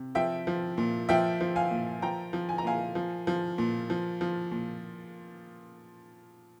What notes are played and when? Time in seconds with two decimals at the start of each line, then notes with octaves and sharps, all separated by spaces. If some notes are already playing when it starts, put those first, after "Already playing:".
Already playing: C3
0.15 F3 E5 G5
0.47 F3
0.78 A#2
1.09 F3 E5 G5
1.41 F3
1.56 F5 G#5
1.71 A#2
2.02 F3 G5 A#5
2.33 F3
2.49 G#5
2.58 A#5
2.65 A#2 F5 G#5
2.95 F3
3.27 F3
3.58 A#2
3.90 F3
4.21 F3
4.51 A#2